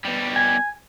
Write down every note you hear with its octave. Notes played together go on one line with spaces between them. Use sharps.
B2 G3
G#5